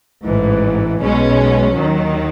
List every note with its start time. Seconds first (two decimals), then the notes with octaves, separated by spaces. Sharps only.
0.24 A1 G#2 E3
0.99 B1 B2 G#3 C#4
1.73 D#2 D#3 F#3